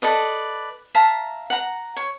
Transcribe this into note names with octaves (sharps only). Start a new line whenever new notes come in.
A4 B4 D5 D#5
E5 F5 A5 A#5
F#5 A#5
C#5